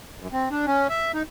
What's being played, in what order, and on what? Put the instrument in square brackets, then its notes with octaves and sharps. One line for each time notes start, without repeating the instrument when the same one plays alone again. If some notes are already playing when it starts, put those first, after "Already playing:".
[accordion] F#2
C4
D4
C#4
E5
D#4